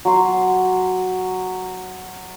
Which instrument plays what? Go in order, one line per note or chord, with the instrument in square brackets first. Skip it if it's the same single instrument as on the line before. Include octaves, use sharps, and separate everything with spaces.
[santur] F#3 C6